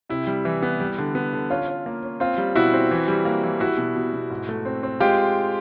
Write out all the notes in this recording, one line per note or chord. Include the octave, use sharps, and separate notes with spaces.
C3 E4
G3
E3
B3
G3
D3
B3
D3
C#4 F4
C#4
A#3
C#4
C4 F4
G3
B2 E4 F#4
C4
E3
G3
A#3
E3
G3 E4 F#4
B2
B2
B2
G#2
A3
C4
C4
G#3 F4 G4